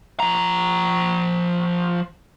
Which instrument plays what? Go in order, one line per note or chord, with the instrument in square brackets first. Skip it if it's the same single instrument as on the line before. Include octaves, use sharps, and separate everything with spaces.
[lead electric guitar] F3 A#5